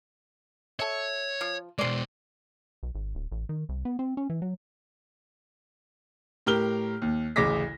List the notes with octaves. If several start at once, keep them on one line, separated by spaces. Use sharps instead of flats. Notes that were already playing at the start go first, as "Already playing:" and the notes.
A4 C#5 E5
F3
B2 G#3 C5 D5
B1
G#1
D1
A1
D#3
C2
B3
C4
C#4
E3
F#3
A2 G4 A#4 F6 G7
D#2
A1 D2 C#3 D6 A#6 B6